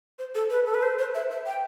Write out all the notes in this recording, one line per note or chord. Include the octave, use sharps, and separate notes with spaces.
C5
A4
B4
A4
B4
C5
C5
E5
E5
G5